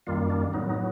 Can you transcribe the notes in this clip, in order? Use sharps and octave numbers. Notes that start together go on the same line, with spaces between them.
F#2 D#3 G3 A#3 F4
D4
A2 F#3 B3 D#4
D#4